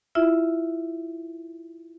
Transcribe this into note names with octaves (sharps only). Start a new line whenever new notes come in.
E4 F4 E5